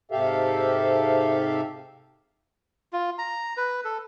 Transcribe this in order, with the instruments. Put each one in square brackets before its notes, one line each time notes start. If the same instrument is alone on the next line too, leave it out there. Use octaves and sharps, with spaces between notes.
[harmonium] G#2 C3 G4 A4 E5 F5
[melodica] F4
A#5
B4
A4